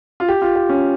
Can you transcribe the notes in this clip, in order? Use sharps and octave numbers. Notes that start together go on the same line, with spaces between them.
F4
G4
F4
G4
C#4